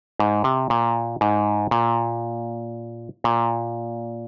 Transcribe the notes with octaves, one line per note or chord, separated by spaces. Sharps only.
G#2
C3
A#2
G#2
A#2
A#2